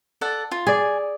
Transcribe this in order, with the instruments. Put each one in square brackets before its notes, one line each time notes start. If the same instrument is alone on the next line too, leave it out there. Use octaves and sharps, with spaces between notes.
[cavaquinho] A4 D5 F#5
F4
[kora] G#4 D5 [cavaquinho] G#5